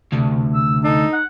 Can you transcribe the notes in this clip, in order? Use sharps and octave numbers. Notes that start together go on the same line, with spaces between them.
D2 C3
E6
D#4 A4
F#5